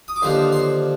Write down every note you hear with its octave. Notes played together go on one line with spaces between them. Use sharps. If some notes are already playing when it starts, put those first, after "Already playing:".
D#6
D6
D#2 D3 F3 C6
C6